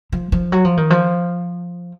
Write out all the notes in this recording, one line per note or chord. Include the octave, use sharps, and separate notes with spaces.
F3
F3
F#3
F3
D#3
F3